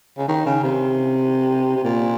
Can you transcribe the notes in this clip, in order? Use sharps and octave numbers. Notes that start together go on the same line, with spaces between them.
C#3
D#3
C#3
C3
C3
A#2